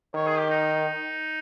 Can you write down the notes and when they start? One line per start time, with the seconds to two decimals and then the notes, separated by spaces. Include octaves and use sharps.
0.15 D#3 C#5
0.27 G#4
0.38 G4
0.50 D#4